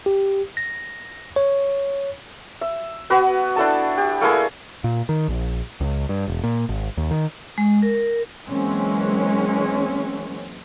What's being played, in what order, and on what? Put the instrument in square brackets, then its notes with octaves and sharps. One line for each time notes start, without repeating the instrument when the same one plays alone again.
[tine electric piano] G4
A#6
C#5
[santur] E5
B3 F#4 B4
D4 E4 A4 A5
G4
A3 A#3 E4 G#4
[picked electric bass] A#2
D#3
A#1
C#2
G2
E1
A#2
G#1
D#2
D#3
[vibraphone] G#3
A#4
[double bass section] E3 F#3 G#3 A#3 C4 C#4